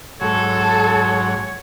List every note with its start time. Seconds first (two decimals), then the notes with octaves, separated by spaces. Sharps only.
0.21 G#2 F#3 A4 C#5